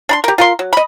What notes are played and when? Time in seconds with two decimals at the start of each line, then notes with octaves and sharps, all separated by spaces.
0.09 D4 B5 C6
0.24 G4 A#4
0.38 F4 A#4 C6
0.59 F#3
0.73 D#5 B5